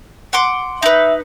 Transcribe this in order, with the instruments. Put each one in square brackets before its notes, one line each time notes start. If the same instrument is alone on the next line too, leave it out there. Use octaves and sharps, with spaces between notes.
[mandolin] F#5 C6 D6
[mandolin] D#4 B4 [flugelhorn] E5